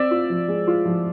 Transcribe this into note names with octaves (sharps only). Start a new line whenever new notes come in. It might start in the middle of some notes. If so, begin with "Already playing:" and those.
Already playing: C4 D5 E5
F4
F3
G#3
F4
F3